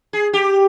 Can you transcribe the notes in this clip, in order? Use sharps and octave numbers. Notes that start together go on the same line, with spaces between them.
G#4
G4